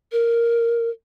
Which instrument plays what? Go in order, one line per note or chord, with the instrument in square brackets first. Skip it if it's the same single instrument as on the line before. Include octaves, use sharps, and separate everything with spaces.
[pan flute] A#4